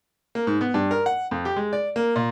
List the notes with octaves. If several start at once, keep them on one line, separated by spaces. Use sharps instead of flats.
A#3
G#2
B3
G2
A#4
F#5
F2
G4
G#3
D5
A#3
A#2